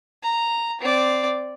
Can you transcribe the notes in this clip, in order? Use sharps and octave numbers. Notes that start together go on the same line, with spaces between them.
A#5
C4 D5